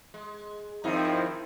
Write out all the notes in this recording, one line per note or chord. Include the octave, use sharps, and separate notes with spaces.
G#3
G2 D#3 F3 C4 D#4 E4